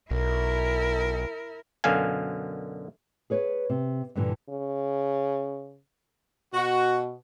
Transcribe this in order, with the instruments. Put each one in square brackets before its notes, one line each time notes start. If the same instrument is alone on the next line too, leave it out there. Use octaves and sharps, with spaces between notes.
[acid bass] B1 [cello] E4 A#4
[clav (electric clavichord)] F#2 B2 D3 F5 G#5
[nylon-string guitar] G#4 B4 C#5
C3
G2 A#2 D3 E3
[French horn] C#3
[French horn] B2 [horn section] F#4